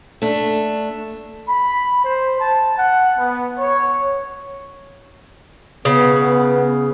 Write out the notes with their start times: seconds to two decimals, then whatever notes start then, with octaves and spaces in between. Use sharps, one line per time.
0.22 A3 D4
1.49 B5
2.05 C5
2.41 A5
2.79 F#5
3.19 B3
3.57 C#5
5.85 C#3 B3